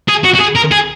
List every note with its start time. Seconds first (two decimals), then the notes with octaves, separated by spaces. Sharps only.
0.09 G#4
0.25 F#4
0.35 F#4
0.41 G#4
0.56 A#4
0.72 G#4